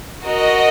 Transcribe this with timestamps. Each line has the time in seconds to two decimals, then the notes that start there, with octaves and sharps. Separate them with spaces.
0.25 F#4 A#4 D#5